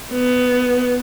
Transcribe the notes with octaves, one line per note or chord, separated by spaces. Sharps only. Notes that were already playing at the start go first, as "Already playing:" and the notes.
B3